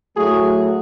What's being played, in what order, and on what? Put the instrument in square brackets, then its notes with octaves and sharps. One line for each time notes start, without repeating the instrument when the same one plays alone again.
[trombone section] A2 F#3 A3 F#4 G#4